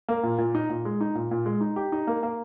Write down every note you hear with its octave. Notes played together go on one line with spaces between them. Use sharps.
A#3
A#2
A#2
D#4
A#2
G#3
D#4
A#2
A#2
G#3
D#4
G4
D#4
A#3
A#3